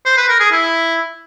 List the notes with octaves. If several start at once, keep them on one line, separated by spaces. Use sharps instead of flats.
C5
B4
A#4
G#4
E4